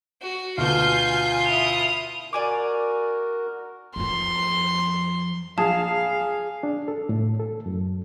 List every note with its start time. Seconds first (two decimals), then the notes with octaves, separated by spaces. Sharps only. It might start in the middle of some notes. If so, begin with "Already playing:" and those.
0.22 F#4
0.58 D2 B2 F4 G#5 F6 G6 C7
1.46 E4 D#6 F7
2.33 F#4 A#4 D5 G#5 D6
3.96 F2 F3 C6
5.58 A#1 G#4 F5 A5
6.63 D4
6.88 A4
7.09 A2
7.40 A4
7.66 F#2